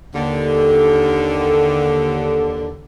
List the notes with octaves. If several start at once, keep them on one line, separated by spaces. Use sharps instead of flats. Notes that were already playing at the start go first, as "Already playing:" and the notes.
D#2 D3